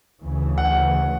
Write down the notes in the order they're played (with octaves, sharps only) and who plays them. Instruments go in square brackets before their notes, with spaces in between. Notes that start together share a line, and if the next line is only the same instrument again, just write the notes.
[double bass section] D2 C#3 E3
[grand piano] F#5